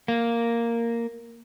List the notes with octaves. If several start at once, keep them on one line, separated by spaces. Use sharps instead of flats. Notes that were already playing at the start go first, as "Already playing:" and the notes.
A#3